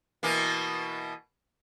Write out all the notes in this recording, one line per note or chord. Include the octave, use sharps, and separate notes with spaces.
B2 E3 A#3